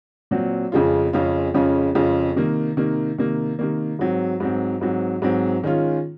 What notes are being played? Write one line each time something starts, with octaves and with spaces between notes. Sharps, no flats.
A#2 F#3 C4
F2 C#3 G#3 C#4 F4
F2 C#3 G#3 C#4 F4
F2 C#3 G#3 C#4 F4
F2 C#3 G#3 C#4 F4
C3 D#3 A#3
C3 D#3 A#3
C3 D#3 A#3
C3 D#3 A#3
G#2 F#3 C4
G#2 F#3 C4
G#2 F#3 C4
G#2 F#3 C4
D#3 G#3 C#4 F4